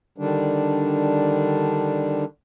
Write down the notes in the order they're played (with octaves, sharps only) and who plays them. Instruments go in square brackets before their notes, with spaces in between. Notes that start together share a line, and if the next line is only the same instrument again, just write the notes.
[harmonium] D3 D#3 G3 D4